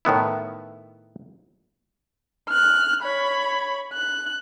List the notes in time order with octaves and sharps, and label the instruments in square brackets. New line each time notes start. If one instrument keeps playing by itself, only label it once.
[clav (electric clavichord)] A2 D#3 B3 E4
[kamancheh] F6 F#6
C#5 B5
F#6